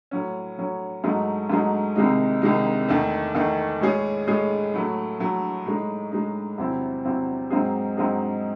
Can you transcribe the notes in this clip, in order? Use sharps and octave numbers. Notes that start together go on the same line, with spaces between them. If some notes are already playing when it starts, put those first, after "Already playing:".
A2 F#3 C#4
A2 F#3 C#4
G#2 F#3 A3 D#4 G#4
G#2 F#3 A3 D#4 G#4
C2 C3 D#3 G#3 D#4
C2 C3 D#3 G#3 D#4
E2 D#3 A3
E2 D#3 A3
A2 G#3 C#4 G#4
A2 G#3 C#4 G#4
A2 F#3 A3
A2 F#3 A3
A2 G#3 D#4
A2 G#3 D#4
E2 C3 F#3 C4 E4
E2 C3 F#3 C4 E4
G#2 F#3 C4 D#4 G#4
G#2 F#3 C4 D#4 G#4